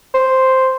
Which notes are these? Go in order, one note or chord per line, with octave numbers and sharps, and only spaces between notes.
C5